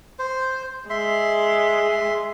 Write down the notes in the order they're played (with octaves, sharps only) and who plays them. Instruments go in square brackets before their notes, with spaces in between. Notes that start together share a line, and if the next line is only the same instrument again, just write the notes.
[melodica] C5
[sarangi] G#3 [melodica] E5 C6